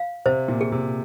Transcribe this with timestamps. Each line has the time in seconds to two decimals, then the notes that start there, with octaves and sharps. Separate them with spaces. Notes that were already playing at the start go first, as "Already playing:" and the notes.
Already playing: F5
0.26 C3 C5
0.48 A#2
0.61 G#4
0.72 C3